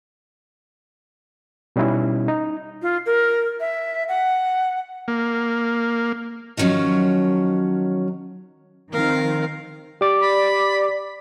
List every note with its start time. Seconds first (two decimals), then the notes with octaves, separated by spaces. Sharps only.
1.76 B2 G3 C#4 D#4 E4
2.28 D#4
2.82 F4
3.06 A#4
3.60 E5
4.08 F#5
5.08 A#3
6.57 D#3 F3 F#3 C#4
8.92 D#3 F3 C4 A#4 F5
10.01 G4 D5 D6
10.22 B5